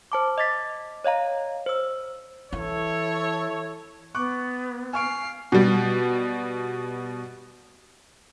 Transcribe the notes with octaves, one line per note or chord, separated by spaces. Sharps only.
C5 A5 D6
D#5 D6 A6 B6
C#5 D#5 F5 A#5
C5 E6
E3 E4 A4 C#5
B3 C#6 D6 F#6
F5 G#5 C#6 C7 D7
B2 G3